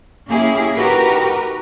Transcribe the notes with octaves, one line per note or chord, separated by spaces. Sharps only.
A#3 C#4 E4 G4 G#4
D#4 F#4 G4 A#4 B4